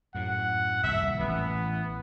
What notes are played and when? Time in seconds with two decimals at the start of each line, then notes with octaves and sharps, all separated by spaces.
0.15 F#2 A2 F#5
0.83 D#1 C2 F2 E5
1.19 A1 A2 B3